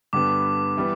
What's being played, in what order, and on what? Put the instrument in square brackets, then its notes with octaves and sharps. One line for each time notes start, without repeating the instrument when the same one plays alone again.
[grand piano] G2 D3 G3 B3 [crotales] D6
[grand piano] E3 G3 B3